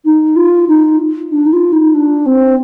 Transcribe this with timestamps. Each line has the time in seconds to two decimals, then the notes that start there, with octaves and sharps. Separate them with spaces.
0.05 D#4
0.36 F4
0.68 D#4
1.30 D4
1.46 D#4
1.52 F4
1.72 D#4
1.94 D4
2.26 C4